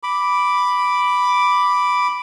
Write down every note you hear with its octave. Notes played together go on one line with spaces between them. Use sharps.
B5 D6